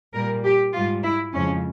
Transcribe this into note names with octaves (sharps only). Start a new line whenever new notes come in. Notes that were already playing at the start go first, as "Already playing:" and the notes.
A#2 G3 A#4
G4
G#2 G3 F4
E4
F2 C#3 F3 G#3 C#4